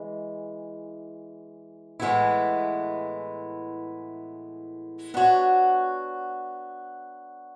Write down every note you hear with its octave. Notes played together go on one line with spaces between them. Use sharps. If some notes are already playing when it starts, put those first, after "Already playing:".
Already playing: E3 G#3
A2 E3 G#3 B3 E4
B3 D4 F#4 C#5